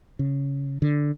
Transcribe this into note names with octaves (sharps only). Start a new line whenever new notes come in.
C#3
D3